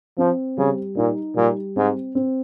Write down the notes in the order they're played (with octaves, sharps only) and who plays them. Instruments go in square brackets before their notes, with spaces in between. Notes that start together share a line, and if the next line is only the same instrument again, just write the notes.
[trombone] F3 [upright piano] C4
[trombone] C#3 [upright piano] G3
[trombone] A#2 [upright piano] D#4
[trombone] A#2 [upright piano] G3
[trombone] G#2 [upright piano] C4
[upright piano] C4